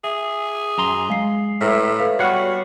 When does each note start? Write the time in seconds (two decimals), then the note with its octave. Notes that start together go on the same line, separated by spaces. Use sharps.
0.04 G#4 E5
0.78 F#2 A#5 C6
1.10 G#3 F5 C7
1.61 A2 B4 E5 A#5 F6
1.99 A4 B4 F5
2.19 G3 B3 F#4 C#5 F#5 C#6 F6 C7